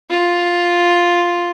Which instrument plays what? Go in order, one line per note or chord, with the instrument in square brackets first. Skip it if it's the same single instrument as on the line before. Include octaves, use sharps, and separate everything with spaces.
[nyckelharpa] F4